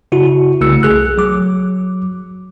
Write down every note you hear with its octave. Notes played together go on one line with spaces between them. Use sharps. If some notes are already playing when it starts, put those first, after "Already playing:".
C#3 E4 F#4
C2 C#3 A3 E6 C#7
B1 G#4 F#6
F#3 D6